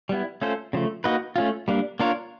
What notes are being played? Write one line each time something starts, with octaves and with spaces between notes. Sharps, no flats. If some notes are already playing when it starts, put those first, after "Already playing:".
G3 B3 E4
A3 C#4 F4 A4 C5
C#3 F3 A3
A#3 D#4 F#4 B4 D#5
A3 C#4 F4
G3 A#3 D4
A#3 D4 F4 A#4 C#5